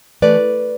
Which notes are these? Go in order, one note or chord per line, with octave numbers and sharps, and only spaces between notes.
E3 A3 B4 D5